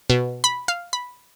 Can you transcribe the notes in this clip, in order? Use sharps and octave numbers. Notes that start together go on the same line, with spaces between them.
B2
B5
F5
B5